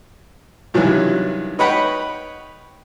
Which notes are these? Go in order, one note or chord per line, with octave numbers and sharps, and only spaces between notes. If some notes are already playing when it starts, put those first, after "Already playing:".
G2 C3 D#3 E3 F#3
D#4 B4 C#5 F#5 G5 B5